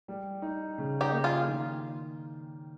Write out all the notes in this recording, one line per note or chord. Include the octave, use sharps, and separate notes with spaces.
G3
D#4
C#3
D#4 G4
A#3
F4 G#4
D#3